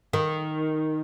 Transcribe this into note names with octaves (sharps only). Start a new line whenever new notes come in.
D#3